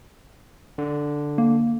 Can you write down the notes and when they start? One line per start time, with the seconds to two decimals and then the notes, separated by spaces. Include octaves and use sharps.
0.78 D3
1.38 A#3